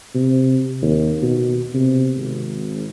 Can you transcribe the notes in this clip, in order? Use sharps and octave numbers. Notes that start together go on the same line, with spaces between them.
C3
D#2
B2
C3
G#1